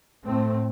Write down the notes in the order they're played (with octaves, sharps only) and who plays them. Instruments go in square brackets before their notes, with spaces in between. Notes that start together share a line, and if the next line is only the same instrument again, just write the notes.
[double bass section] A2 A3 C4